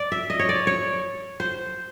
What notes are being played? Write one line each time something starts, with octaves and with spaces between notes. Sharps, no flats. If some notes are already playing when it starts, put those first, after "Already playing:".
Already playing: D5
E5
D#5
C#5
D5
C#5
C5